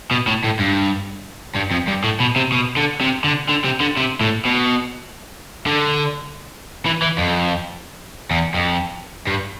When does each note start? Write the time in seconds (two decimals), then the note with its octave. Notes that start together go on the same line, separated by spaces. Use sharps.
0.11 B2
0.27 A2
0.44 A2
0.59 G2
1.56 G2
1.71 F2
1.88 G2
2.04 A2
2.20 B2
2.36 C3
2.52 B2
2.76 D3
3.01 C3
3.24 D3
3.49 D3
3.65 C3
3.81 D3
3.97 C3
4.21 A2
4.45 B2
5.66 D3
6.86 E3
7.02 E3
7.18 F2
8.31 E2
8.54 F2
9.27 G2